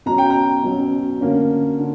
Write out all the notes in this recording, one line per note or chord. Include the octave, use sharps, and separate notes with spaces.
B2 F#3 C#4 A#5
G5
A#5
B2 F#3 C#4
D3 A#3 C#4
D3